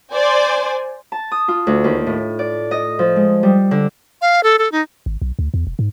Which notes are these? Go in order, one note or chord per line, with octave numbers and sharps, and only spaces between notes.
C5 D5 G#5
A5
D#6
F4
D2
D#2
A2
D5
D#5
F3
G#3
G3
D3
F5
A4
A4
D#4
G#1
B1
D2
E2
E1
G#2